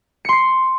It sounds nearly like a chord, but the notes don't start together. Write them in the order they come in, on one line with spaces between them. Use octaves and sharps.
C#7 C6 C7